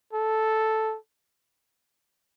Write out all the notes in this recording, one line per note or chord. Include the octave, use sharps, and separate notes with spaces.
A4